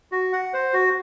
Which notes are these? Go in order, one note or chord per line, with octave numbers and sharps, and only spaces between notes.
F#4
F#5
C5
F#4